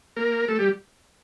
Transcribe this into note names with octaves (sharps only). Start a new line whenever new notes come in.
A#3 A#4
A3 A4
G3 G4